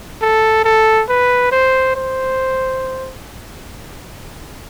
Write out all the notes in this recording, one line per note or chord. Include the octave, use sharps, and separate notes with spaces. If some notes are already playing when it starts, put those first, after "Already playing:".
A4
A4
B4
C5
C5